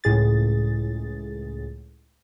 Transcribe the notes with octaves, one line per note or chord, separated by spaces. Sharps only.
C#2 A2 G#4 A6